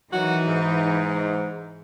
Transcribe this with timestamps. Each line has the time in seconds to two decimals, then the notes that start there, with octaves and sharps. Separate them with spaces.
0.12 D#3 E3 F#3 D#4 F#4
0.47 G#2